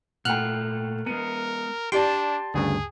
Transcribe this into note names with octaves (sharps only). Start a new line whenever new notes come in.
A#2 A3 A#3 F#5 G5 F6 F#6
G#3 B3 A#4 D#7
D4 G4 D5 G5 A5 C6
D2 G2 C#3 G#4